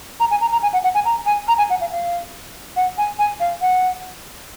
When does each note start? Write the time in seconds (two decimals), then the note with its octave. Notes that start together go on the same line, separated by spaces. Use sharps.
0.20 A#5
0.31 G#5
0.41 A#5
0.52 A#5
0.62 G#5
0.73 F#5
0.84 F#5
0.95 G#5
1.05 A#5
1.26 G#5
1.48 A#5
1.58 G#5
1.70 F#5
1.81 F5
1.91 F5
2.76 F#5
2.98 G#5
3.19 G#5
3.40 F5
3.62 F#5